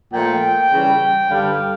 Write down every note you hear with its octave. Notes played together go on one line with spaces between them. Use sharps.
A#2 F3 A3 G5
C#3 E3 G3
G2 D3 G3 F5